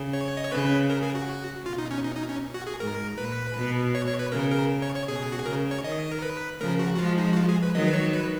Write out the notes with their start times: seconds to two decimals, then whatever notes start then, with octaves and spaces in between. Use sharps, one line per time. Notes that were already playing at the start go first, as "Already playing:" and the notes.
Already playing: C#3
0.13 C#5
0.37 D#5
0.44 C#5
0.52 C#3 B4
0.90 A#4
1.03 G#4
1.15 F#4
1.65 B2 F4
1.78 D#4
1.91 C#4
2.04 D#4
2.16 D#4
2.29 C#4
2.54 F#4
2.67 G#4
2.80 G#2 A#4
3.18 A#2 B4
3.56 B2
3.95 C#5
4.07 C#5
4.19 B4
4.32 C#3 A#4
4.51 A#4
4.82 C#5
4.96 C#5
5.08 B2 G#4
5.32 F#4
5.40 G#4
5.46 C#3 A#4
5.71 C#5
5.84 D#3 D#5
6.11 A#4
6.22 B4
6.61 C#3 F3 A#4
6.79 F#4
6.95 F#4
6.98 F3 G#3 F4
7.18 D#4
7.33 F#4
7.37 F4
7.49 G#4
7.63 B4
7.75 D#3 F#3 D#5
7.88 B4
7.93 C#5
8.13 B4